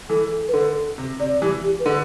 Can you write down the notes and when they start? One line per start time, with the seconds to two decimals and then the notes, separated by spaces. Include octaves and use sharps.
0.09 E3 A4
0.48 B4
0.54 D3 A4
0.98 C3
1.19 C3 D5
1.41 E3 G4
1.64 G4
1.79 B4
1.86 D3 A4